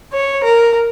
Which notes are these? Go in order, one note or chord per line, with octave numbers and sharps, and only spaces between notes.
C#5
A#4